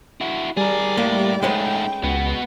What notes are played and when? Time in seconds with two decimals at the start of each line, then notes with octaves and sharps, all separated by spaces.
0.21 E4 F#4
0.57 G3 G#4 A#4 D5
0.98 A2 A#3
1.43 G#2 G#3 A3 C#4 B4 G5
2.04 C#2 B3 F#4